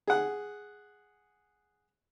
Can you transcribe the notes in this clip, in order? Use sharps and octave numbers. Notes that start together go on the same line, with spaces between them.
G#4 F#5